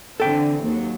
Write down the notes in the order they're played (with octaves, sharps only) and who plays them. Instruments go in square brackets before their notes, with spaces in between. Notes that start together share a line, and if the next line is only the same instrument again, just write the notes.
[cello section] D3 E3 C4 [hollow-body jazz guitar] A4 G5
[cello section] D#2 F#3